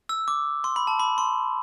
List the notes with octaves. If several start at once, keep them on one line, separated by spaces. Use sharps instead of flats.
E6
D6
C6
B5
A5
B5
C6